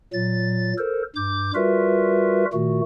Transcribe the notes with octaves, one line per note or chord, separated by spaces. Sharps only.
A#2 F#3 A6
A4 A#4 C5
G2 D6 G6
G3 F4 F#4 A#4 B4 E5
A#2 D#3 A3 F#4